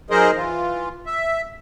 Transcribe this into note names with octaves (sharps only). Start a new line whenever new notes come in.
F#3 D#4 G#4 A#4 C5 D#5
E3 F4
E5